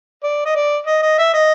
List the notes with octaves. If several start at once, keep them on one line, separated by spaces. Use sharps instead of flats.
D5
D#5
D5
D#5
D#5
E5
D#5